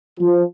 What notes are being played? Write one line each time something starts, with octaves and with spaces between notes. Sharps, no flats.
F3